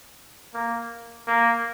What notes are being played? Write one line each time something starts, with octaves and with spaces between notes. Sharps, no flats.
A#3
A#3